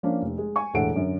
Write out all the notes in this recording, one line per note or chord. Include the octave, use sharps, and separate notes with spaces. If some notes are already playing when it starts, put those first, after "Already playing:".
F3 A#3 C#4 D4
F1
G#3
G#5 C#6
E1 D2 A2 A4 F#5 D7
F#2 D3